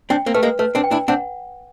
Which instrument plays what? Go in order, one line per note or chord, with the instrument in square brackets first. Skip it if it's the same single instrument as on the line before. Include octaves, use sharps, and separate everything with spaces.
[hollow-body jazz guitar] C4 D4 [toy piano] G5
[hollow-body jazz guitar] A#3 C4
[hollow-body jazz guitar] A3 [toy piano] B4
[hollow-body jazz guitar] G#3 A#3
[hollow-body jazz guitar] A3 [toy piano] B4
[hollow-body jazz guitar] C4 D4
[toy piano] G5
[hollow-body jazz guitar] D4 E4
[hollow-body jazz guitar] C4 D4 [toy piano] F#5